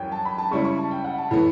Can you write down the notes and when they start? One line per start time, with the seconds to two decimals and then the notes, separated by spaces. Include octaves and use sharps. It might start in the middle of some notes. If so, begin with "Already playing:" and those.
Already playing: F#2 E3 G3 C#4 G5
0.12 A5
0.25 B5
0.38 A5
0.51 C#3 G3 C#4 E4 C#6
0.65 C#6
0.78 A5
0.91 G5
1.04 F#5
1.18 A5
1.31 A2 E3 B3